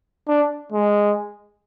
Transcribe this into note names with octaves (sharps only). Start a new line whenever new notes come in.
D4
G#3